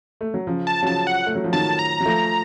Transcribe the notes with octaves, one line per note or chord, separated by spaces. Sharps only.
A3
F#3
C#3 F3
A5
F#3
C#3 F3 A5
F#5
A3
F#3
F3
D#3 F#3 A5
A#5
F#3
F3 A3